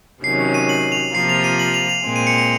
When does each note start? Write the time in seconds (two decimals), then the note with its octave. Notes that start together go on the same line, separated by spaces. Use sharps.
0.24 C3 D#3 F#3 C#4 C7
0.54 D#7
0.69 F#7
0.92 F7
1.14 C3 F3 A#3 F4 C7
1.29 F7
1.44 D#7
1.59 F#7
1.74 F7
1.89 F7
2.04 A#2 G#3 C4
2.16 D#7
2.27 C#7
2.38 C#7